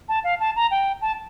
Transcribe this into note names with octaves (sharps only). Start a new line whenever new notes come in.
A5
F5
A5
A#5
G5
A5